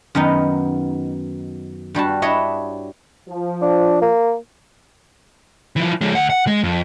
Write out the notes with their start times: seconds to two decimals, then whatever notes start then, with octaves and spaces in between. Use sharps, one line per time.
0.15 F#2 D#3 B3 D#4
1.95 G2 G3 F#4 A5
2.22 D4 E4 C#5 D#5 E5
3.29 F3
3.62 D4
4.02 A#3
5.76 E3 F3
6.01 F3 G#3
6.15 D2 F#5
6.30 F#5
6.47 G#3
6.64 F2